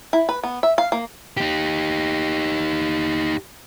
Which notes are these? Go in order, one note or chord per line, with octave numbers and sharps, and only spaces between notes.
E4
B4
B3
E5
F5
A#3
D#4 G4